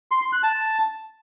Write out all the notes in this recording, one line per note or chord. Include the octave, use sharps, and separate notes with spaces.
C6
C6
F#6
A5